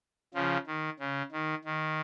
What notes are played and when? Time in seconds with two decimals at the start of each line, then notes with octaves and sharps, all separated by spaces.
0.34 C#3 F3
0.67 D#3
0.99 C#3
1.32 D#3
1.65 D#3